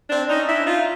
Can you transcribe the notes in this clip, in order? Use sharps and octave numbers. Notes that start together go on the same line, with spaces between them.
C4 D4
C#4 D#4
D4 E4
D#4 F4